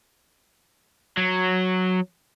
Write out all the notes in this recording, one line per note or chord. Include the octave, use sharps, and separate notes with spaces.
F#3